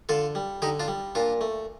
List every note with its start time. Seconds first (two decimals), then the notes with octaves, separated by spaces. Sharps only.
0.09 D3 F4 A4
0.35 G3
0.62 D3 D#4 G4
0.80 D4 F4
0.88 G3
1.15 A#2 D4 F4
1.41 A3